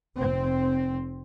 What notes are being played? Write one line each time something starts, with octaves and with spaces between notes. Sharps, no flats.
F1 C4